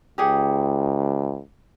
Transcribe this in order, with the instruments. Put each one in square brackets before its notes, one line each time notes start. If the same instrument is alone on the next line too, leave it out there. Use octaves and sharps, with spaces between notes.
[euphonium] C#2 [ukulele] G4 G#4 F#5